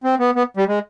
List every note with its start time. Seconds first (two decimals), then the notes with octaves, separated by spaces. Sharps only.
0.04 C4
0.19 B3
0.36 B3
0.57 G3
0.68 G#3